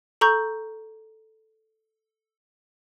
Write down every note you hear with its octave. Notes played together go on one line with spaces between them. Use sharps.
A4 A#5 C#6 G6